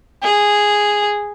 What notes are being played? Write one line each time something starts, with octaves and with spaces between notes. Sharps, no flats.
G#4